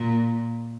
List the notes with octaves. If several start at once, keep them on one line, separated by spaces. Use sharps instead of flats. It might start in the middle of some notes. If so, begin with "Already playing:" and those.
Already playing: A#2